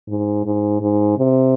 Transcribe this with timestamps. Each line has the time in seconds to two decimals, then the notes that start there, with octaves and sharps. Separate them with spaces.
0.08 G#2
0.45 G#2
0.81 G#2
1.17 C3